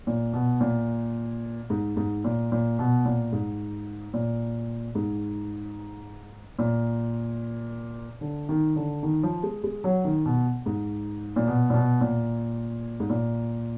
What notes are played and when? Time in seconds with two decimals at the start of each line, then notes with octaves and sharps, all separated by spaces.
0.07 A#2
0.33 B2
0.61 A#2
1.70 G#2
1.97 G#2
2.24 A#2
2.52 A#2
2.79 B2
3.05 A#2
3.33 G#2
4.14 A#2
4.95 G#2
6.59 A#2
8.21 D3
8.49 D#3
8.76 D3
9.03 D#3
9.23 F3
9.43 G#3
9.64 G#3
9.84 F#3
10.05 D#3
10.26 B2
10.66 G#2
11.36 A#2
11.47 B2
11.70 A#2
11.74 B2
12.01 A#2
13.00 G#2
13.10 A#2